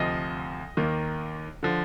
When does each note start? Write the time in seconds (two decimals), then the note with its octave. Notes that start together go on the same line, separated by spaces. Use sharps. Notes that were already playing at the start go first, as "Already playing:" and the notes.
Already playing: D2 C3 F3 D#5
0.77 D#2 D#3 A#3
1.63 D3 F3